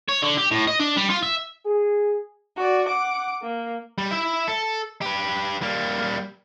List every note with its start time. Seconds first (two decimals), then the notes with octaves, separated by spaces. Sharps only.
0.08 C#5
0.22 D3
0.37 G4
0.51 A2
0.67 D#5
0.80 D4
0.97 G3
1.10 F4
1.23 E5
1.66 G#4
2.57 F#4 D5
2.88 F#5 D6
3.43 A#3
3.98 G3
4.11 E4 E5
4.48 A4
5.02 G4 B4
5.62 G3 A#3